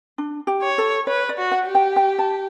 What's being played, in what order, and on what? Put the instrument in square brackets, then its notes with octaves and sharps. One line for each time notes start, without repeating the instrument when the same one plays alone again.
[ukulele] D4
G4
[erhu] C#5
[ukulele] A4
[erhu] B4 [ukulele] C#5
[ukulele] D5
[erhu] F#4
[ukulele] F#5
[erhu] G4
[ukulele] G5
G5
A5